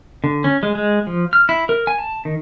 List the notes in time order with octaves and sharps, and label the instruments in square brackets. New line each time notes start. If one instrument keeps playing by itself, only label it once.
[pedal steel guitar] D3
C#4
G#3
G#3
F3
F6
E4
A#4
G#5
A5
D#3